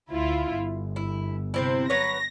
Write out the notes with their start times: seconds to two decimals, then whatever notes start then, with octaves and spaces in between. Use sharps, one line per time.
0.12 D2 E4 F4
0.55 G1
0.96 E4
1.54 C3 C4 E4
1.90 F#3 B4 C#5 A#6